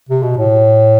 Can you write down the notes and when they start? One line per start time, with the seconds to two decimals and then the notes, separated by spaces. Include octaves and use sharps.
0.09 C3
0.22 B2
0.37 A2